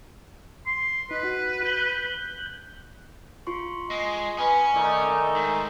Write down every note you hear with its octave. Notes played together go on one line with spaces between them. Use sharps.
C6
D#4 B4
F#4
F#6 G6
F4 C6 C#6
G#3 D#5
C#4 B4 G#5
D#3 A3 D#4 D5
G#2